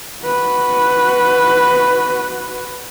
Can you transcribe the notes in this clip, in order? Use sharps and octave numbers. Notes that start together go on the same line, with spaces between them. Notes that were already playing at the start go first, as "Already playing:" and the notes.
F#4 B4